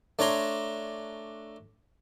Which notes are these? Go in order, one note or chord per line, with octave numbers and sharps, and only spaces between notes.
A3 D4 C#5 A#5 C6